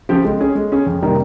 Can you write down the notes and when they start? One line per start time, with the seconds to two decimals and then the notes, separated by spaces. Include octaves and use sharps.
0.09 C#3 F3 C4 G4
0.25 G#3
0.40 C#4 G#4
0.55 G#3
0.72 C#4 G#4
0.86 F2
1.02 C3 D#3 G3 A#3